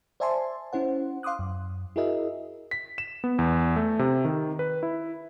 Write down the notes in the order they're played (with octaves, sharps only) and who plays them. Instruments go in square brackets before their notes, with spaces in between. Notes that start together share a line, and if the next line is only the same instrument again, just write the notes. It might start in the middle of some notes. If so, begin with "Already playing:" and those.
[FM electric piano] C5 D5 E5 G#5 A5 C6
C#4 E4 C5 F#5
F5 C6 D6 D#6 F#6
F#2
E4 F#4 G#4 A#4 D#5 E5
[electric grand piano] B6
E7
B3
E2
A3
C3
D#3
B4
E4